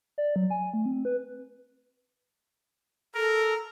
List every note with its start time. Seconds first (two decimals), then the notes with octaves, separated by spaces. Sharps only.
0.18 D5
0.36 F#3
0.50 G#5
0.74 A3
0.86 C4
1.05 B4
3.15 A4 A#4